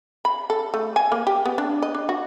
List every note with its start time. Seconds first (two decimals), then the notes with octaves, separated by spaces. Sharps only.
0.25 B5
0.50 A4
0.74 A3
0.96 G#5
1.12 A#3
1.27 G4
1.45 B3
1.58 D4
1.82 D#5
1.94 D4
2.09 F#4